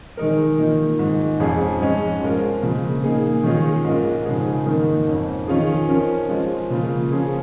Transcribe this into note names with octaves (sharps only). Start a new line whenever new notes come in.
D#3 G#3 D#4 A#4
D#3 A#3 F4
G#2 D#3 G#3
F2 F3 C#4 F4 G#4
G#2 G#3 C#4
F3 G#3 F4 A#4
C#3 F3 A#3
A#2 A#3 D#4 G#4
D#3 G#3 C#4 F4 G#4
G#2 G#3 F4 A#4
C#3 F3 G#3 D#4 G#4
G#2 D#3 A#3 D#4 A#4
F2 F3 C#4
D#3 C#4 F4 G#4
F3 C#4 A#4
F3 G#3 F4
C#3 A#3 F4 A#4
F3 C#4 F4 G#4